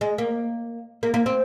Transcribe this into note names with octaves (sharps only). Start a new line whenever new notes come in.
G#3
A#3
A#3
A#3
C4